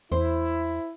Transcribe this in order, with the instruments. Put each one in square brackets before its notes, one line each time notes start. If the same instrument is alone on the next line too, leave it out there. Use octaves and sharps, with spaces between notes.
[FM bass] E2 [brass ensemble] E4 [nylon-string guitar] C5